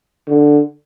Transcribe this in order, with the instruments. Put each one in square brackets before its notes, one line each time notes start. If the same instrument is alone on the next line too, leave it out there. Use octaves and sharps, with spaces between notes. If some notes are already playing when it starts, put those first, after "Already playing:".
[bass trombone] D3